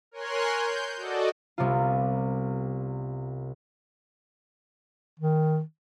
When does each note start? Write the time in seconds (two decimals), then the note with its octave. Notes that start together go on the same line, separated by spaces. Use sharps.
0.11 A#4 C#5 G#5 C6 F#6
0.52 G6
0.96 F#4 A4 D5 D#5
1.58 C2 C3 G3 B3 F4
5.19 D#3